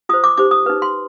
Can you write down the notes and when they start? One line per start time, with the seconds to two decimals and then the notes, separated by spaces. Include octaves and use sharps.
0.09 F4 D#6
0.14 C5
0.24 D6
0.37 D#4 G4 C5 D6
0.51 D#6
0.66 D#4 B4
0.82 C6